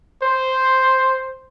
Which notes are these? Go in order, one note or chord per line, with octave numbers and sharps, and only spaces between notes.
C5